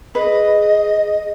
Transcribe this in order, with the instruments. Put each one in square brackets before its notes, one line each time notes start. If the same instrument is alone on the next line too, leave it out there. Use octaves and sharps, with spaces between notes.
[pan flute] G#4 [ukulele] B4 [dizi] D#5